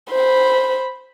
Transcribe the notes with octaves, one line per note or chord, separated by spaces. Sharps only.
C5 B5